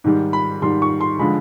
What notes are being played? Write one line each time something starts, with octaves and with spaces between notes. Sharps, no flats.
G#2 D#3 G3
B5
G#2 D#3 G3 C6
C#6
C6
D3 F3 G#3 B5